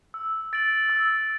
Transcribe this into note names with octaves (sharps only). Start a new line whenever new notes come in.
E6
A6 D7 F#7
E6